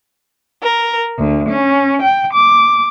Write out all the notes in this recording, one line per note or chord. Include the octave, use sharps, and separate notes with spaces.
A#4
D2
C#4
G5
D6